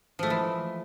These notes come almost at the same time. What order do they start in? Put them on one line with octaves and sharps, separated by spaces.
F3 A3 G#3 E3